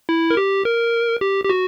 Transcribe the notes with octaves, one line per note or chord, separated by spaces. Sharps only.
E4
A#4
G4
A#4
G4
G4
F#4